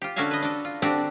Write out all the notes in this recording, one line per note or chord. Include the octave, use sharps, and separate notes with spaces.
F4 G4
D3 C#4 F#4 E5 F5 G#5
B4 D#5
D4 A4
F4
D3 C4 D4 F#4 G4 D5